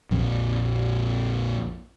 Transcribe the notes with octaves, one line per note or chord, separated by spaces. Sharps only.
A#1 F2